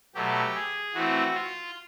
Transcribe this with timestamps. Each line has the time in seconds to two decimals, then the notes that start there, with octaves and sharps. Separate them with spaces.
0.15 B2 F#3 A3 G4
0.55 G#4
0.94 E3 A3 C4 F#4
1.34 F4